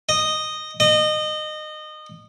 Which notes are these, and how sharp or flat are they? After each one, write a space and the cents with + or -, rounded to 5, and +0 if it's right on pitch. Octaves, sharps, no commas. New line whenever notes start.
D#5 -10
D#5 -25